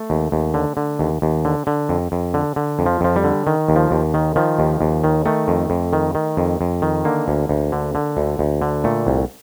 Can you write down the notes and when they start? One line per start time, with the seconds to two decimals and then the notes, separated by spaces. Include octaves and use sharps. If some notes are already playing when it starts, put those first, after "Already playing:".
Already playing: A3
0.10 D#2
0.32 D#2
0.54 D3
0.77 D3
0.99 D#2
1.22 D#2
1.45 D3
1.67 D3
1.89 F2
2.12 F2
2.34 D3
2.56 D3
2.79 F2
2.86 F3
3.01 F2 F3
3.16 G3
3.24 D3
3.47 D#3
3.69 D#2
3.76 F3
3.91 D#2
4.14 D#3
4.36 D#3 F3
4.59 D#2
4.81 D#2
5.04 D#3
5.26 D#3 A3
5.48 F2
5.70 F2
5.93 D#3
6.15 D#3
6.37 F2
6.61 F2
6.82 D#3
7.05 D3 A#3
7.28 D2
7.49 D2
7.72 D3
7.95 D3
8.17 D2
8.39 D2
8.62 D3
8.84 A#2 A3
9.07 C2